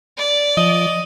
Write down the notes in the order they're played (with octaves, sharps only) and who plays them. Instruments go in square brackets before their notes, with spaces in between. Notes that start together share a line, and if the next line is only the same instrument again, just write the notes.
[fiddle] D5
[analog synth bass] F3 [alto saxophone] D#5